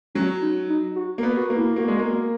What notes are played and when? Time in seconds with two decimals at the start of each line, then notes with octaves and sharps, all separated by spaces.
0.15 F#3 C#4
0.42 D#4
0.69 D#4
0.96 F#4
1.18 A#3
1.23 B3
1.37 F#4
1.50 A#3
1.56 E4
1.76 A#3 F#4
1.88 G#3
1.99 A#3